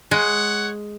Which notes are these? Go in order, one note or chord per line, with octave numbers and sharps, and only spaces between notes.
G#3 C#5 F#5